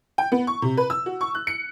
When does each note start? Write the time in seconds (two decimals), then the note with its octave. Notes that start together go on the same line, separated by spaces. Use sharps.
0.18 G5
0.32 B3
0.47 C#6
0.62 C3
0.77 B4
0.90 E6
1.06 F#4
1.21 C#6
1.35 F#6
1.47 C#7